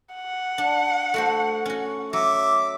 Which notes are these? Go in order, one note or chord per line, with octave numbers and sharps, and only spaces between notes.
F#5
D4
A3 F#4 C5
C#4 F#4
F#3 E5 D6